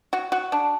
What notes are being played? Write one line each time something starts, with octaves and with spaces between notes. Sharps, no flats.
F#4
F#4
D4